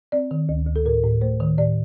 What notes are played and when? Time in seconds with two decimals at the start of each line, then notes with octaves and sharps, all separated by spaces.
0.12 C4 D5
0.31 D#3
0.49 D2
0.67 D2
0.76 A4
0.85 A2 A#4
1.04 A2
1.21 A3 C5
1.40 D#3
1.58 A2 D5